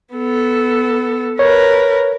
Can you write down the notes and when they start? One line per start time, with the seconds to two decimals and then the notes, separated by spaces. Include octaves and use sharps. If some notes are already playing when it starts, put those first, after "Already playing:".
0.15 B3 A4
1.39 A#4 B4 C#5